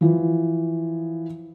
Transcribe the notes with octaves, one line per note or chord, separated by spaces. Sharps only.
E3 F3